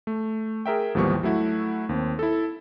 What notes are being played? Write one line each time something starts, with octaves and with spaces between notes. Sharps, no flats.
A3
G#4 A#4 E5 G5
A1 D#2 F3 G3 B3 C#6
F#3 A3 E4 F#4
D#2 C4
E4 A4